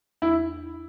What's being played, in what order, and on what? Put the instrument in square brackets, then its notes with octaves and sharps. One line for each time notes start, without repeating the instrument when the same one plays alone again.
[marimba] E2 [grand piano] E4